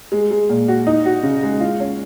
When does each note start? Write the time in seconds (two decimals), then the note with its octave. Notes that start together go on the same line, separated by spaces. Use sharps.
0.12 G#3
0.31 G#3
0.49 A#2
0.68 F#4
0.87 D#4
1.06 F#4
1.23 C#3
1.43 G#3
1.60 F4
1.80 C#4